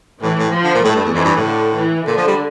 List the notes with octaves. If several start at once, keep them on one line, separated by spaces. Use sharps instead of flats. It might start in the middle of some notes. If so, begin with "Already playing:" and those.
A2 E3
A2
F3
D3
A#2
A2 A3
G2
E2
F2 E3
G2
A2
D3
E3
A#2 D3
F3
G3